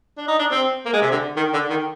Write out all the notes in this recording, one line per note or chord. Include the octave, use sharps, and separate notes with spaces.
D4
D#4
D4
C4
A#3
G#3
C3
D3
D#3
D3
D#3